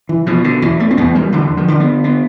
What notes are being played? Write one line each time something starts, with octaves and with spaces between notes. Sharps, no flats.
E3
B2 F3
D3
E2 E3
A3
C4
E2 B3
G3
D3 E3
F3
D3
B3
B3